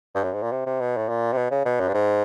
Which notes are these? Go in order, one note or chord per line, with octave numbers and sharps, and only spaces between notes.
G2
F#2
G#2
A#2
C3
C3
B2
A2
A#2
C3
B2
C#3
B2
F#2
G2
G#2